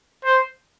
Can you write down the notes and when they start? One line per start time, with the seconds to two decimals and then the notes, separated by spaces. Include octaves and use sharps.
0.25 C5